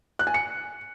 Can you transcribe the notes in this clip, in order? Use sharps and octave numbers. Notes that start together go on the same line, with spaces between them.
F#6
G#5
C#7